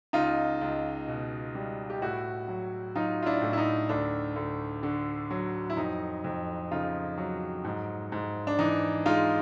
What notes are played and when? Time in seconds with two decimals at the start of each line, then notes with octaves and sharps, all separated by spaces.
0.13 C#2 D#4 F4
0.61 C#2
1.08 B2
1.55 G3
1.90 G4
2.01 A2 E4 F#4
2.48 F#3
2.96 F#3 D#4 F4
3.23 F4
3.26 D4 E4
3.42 A2
3.53 E4
3.58 D#4
3.89 D2 D4
4.36 D2
4.83 D3
5.30 F#3
5.70 E4
5.77 F2 D#4
6.24 F2
6.71 C#3 D#4 F4
7.18 F#3
7.64 G#2
8.12 G#2
8.47 D4
8.59 E3 D#4
9.05 G#3 D#4 F4